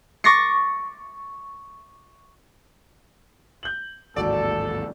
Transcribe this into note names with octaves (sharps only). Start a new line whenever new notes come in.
C#6 D6 A6 A#6 C7 C#7
G6 F#7
A1 D#2 G#2 F#4 A4 D5